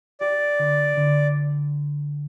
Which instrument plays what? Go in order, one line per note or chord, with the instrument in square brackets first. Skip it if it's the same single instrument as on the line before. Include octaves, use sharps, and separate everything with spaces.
[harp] G4 [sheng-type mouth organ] D5
[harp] D3
D3